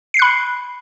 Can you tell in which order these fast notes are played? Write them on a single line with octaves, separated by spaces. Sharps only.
C7 C#7 F#6 B5